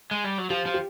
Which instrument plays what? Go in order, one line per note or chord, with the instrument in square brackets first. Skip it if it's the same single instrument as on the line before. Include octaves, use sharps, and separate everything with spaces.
[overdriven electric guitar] G#3
G3
F#3
[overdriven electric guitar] F3 [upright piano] G4
[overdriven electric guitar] F3
[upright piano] G4